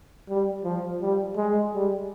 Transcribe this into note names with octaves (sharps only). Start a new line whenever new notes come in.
G3
F3
G3
G#3
G3